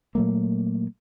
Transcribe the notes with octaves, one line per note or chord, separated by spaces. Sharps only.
A#2 F#3 A3 A#3